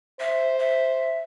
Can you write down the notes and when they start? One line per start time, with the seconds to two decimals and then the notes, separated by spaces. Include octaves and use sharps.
0.20 C5 E5
0.59 E5